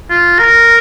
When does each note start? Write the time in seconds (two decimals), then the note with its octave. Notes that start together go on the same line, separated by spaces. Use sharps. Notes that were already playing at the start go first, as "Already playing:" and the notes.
0.10 F4
0.39 A#4